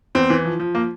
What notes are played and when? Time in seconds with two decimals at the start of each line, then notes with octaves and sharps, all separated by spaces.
0.15 E2 C4
0.30 E3
0.45 F3
0.60 F3
0.75 A#3